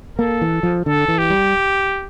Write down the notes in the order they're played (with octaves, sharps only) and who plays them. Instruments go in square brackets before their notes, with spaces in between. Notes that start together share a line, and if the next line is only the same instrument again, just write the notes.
[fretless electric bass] A#3 [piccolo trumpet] A4
[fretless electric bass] E3
F3
[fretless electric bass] D3 [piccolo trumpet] A4
[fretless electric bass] E3
[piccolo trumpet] G4
[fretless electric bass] G3